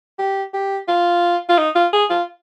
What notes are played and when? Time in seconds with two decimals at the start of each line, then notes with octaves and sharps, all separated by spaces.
0.19 G4
0.53 G4
0.88 F4
1.49 F4
1.58 D#4
1.75 F4
1.93 G#4
2.10 F4